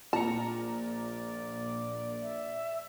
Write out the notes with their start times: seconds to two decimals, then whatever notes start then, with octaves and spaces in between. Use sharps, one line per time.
0.13 A#1 A#2 D5 A5 A#5 C#7
2.22 E5